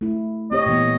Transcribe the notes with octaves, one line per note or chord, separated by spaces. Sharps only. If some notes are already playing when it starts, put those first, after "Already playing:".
A3 E4
C4 G4 C#5 D#5
A#2 E3 B3